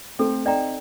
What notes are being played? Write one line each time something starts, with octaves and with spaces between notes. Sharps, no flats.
A3 C4 A4
C4 D#4 D5 G5 A#5